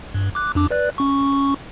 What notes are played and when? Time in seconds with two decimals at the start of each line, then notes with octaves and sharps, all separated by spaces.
0.14 G2
0.35 D6 F#6
0.55 F2 D4 D6
0.71 B4 D5 F#6
0.98 C#4 C#6